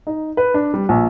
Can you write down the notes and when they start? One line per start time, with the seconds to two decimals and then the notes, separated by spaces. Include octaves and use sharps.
0.07 D#4
0.37 B4
0.54 D4
0.74 G3
0.89 A#1